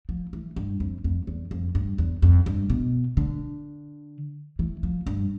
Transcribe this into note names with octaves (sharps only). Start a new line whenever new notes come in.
F3
E3
G2
F2
F2
E2
F2
G2
E2
F2
G2
B2
D3
E3
F3
G2